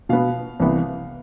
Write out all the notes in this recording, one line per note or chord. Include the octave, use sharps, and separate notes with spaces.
B2 B3 F5
C2 C3 E3 B3